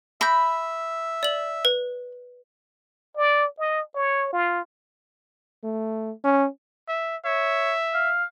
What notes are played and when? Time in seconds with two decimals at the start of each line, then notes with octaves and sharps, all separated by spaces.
0.21 E5 B5 G6 A#6
1.23 D5 F#7
1.65 B4
3.17 D5
3.59 D#5
3.95 C#5
4.33 F4
5.64 A3
6.24 C#4
6.88 E5
7.25 C#5 E5
7.94 F5